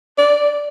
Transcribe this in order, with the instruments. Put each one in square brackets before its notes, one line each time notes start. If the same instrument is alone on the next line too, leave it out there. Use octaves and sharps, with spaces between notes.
[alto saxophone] D5